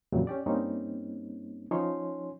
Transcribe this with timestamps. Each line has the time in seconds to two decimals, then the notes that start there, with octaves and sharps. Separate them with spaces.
0.13 F2 A#2 C#3 E3 F#3 G3
0.27 C#4 G4 D5
0.46 G2 G3 A#3 C4 C#4 D#4
1.71 F3 C#4 D#4 C#5 G#5 C6